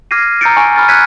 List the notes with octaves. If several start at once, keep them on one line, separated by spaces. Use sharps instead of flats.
D6 F6 G#6 A#6 C7 D#7
A#5 E6 G6 A6 C#7 D7
G#5 C#6 D7
B5 F6 A6
E6 F#6 G#6 B6 C#7 D#7